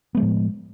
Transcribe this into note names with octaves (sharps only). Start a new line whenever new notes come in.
A2 F3 G#3 B3